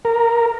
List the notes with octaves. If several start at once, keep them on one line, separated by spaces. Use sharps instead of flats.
A#4